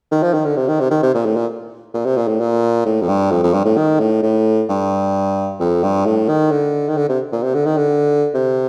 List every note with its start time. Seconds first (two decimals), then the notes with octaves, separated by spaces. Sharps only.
0.11 D#3
0.23 F3
0.33 D#3
0.45 D3
0.57 C3
0.68 D#3
0.80 C3
0.91 D#3
1.02 C3
1.14 A#2
1.26 A2
1.36 A#2
1.94 A#2
2.05 C3
2.17 A#2
2.28 A2
2.40 A#2
2.86 A2
3.01 F2
3.08 G2
3.31 F2
3.43 F2
3.53 G2
3.65 A2
3.77 D#3
3.99 A2
4.22 A2
4.69 G2
5.60 F2
5.83 G2
6.05 A2
6.28 D#3
6.51 D3
6.89 D#3
6.97 D3
7.09 C3
7.32 A#2
7.43 C3
7.54 D3
7.66 D#3
7.77 D3
8.34 C3